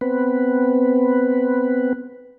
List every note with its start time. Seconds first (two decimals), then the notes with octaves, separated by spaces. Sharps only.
0.01 B3 C4 B4